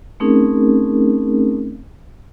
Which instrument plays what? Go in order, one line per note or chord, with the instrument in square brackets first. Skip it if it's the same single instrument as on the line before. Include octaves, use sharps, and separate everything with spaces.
[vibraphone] A3 C4 C#4 D#4 G#4 A#4